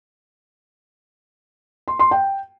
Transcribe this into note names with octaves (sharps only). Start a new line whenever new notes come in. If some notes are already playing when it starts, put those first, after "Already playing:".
C6
C6
G5